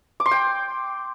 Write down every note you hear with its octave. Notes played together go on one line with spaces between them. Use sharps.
D6
C6
G5